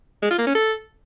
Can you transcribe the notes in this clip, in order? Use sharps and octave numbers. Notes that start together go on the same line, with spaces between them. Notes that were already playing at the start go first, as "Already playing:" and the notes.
G#3
F4
A#3
C#4
A4